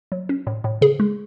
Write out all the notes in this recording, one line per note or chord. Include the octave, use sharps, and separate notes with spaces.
F#3
C#4
A2
A2
C#3 G#4
G#3